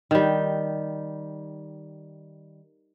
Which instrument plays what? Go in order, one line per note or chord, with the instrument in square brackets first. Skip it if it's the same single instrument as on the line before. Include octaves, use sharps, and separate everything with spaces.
[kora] D#3 G3